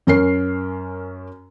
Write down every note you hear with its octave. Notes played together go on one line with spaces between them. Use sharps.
F#2 C#4 A#4 C7